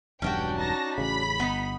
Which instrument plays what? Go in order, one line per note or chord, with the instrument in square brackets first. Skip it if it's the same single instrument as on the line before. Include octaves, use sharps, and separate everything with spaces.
[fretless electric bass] E1 B1 G2 [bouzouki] C#4 D4 F#4 [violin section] G5
[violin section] D#4 A5 A#6
[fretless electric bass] A1 C#3 [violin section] B5 B6
[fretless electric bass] G1 [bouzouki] B3 D#4